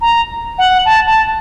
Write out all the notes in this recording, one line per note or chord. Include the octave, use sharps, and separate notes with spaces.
A#5
F#5
A5
A5